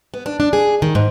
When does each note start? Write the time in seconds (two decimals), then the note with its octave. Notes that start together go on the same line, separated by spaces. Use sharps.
0.14 B3
0.26 D4
0.40 D4
0.53 G#4
0.82 D#3
0.95 G#2